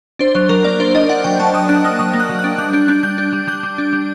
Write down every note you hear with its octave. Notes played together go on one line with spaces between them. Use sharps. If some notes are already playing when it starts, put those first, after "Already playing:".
D4 C5
F#3 C5
F#3 A#4
A#3 D5
D4 C5
D4 D#5
D4 F#5
F#3 G5
F#3 A5
F#3 D#6
D4 F#6
A#3 D#6
F#3 D#6
A#3
F#6
F#3
F#6
D4
G3 F#6
D4 G6
D4 F#6
G3 G6
D4
G3
G3 G6
G3
D4
G3